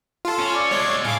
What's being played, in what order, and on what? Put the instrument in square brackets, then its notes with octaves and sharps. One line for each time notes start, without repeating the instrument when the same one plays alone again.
[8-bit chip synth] F4 A4
[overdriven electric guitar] C#4
[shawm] D5
[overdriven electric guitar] G#3 A3 [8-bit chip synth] C#5
[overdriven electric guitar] A2 [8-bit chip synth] F5 D6 [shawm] G#5